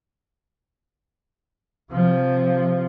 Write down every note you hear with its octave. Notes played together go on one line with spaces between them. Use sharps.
C3 F3